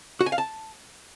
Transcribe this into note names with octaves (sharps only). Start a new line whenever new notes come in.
F#4
G#5
F5
A5